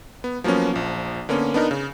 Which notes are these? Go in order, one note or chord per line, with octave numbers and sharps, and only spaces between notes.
B3
F3 F#3 A#3 B3 C#4
A#1 F3
D3 A#3 B3 C#4
B3 D4 D#4 A#4
C#3